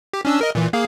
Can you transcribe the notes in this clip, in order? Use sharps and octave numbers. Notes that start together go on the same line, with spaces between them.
G4
C#4 D4 E6
A#4 D#5
A#2 E3
A#3 G#4 F5